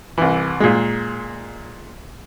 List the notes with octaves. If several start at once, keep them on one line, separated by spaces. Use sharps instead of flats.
C2 E3
A#2 G#3